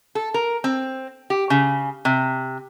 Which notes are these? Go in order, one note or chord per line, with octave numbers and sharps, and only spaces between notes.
A4
A#4
C4
G4
C#3
C3